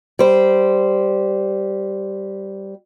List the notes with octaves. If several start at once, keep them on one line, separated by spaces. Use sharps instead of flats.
G3 C5